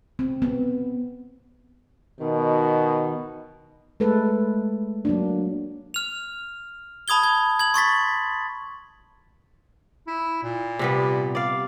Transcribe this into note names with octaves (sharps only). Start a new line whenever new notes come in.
C4
B3
B2 D#3
G#3 A3 A4 B4
F#3 A#3 D4
F6 F7
A5 B5 D#6 G#6 G7
G#6
G#6 F#7
C6 C#6 A6 B6
E4
A#2
C3 G3 B3
D5 F5